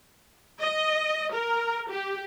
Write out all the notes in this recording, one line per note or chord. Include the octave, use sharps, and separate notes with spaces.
D#5
A#4
G4